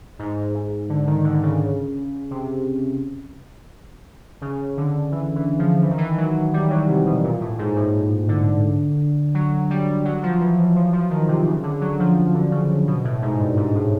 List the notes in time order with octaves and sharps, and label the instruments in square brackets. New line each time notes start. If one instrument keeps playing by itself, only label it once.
[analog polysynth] G#2
G#2
D3
D#3
D3
C#3
C3
C#3
D3
E3
E3
F3
E3
D#3
E3
F#3
G3
F#3
C3
B2
A#2
A2
G#2
A2
D3
F#3
G3
F#3
F3
E3
E3
F3
F3
D#3
C3
C#3
D3
F#3
F3
D3
C#3
B2
A2
G#2
G2
G#2
A2